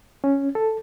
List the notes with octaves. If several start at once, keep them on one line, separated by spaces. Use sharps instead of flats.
C#4
A4